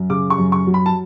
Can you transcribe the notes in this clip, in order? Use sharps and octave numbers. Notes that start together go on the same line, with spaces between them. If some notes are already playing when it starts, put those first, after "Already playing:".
Already playing: F#2
C#3 D6
C#6
F#2
C#6
F#3
B5
A5